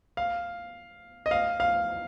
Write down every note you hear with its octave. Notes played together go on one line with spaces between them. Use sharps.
F5
D#5
F5
F5